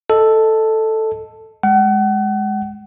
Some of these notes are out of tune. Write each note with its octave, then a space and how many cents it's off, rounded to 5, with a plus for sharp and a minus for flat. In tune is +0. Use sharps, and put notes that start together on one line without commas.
A4 +0 D#5 +0
G#3 +0 F#5 +35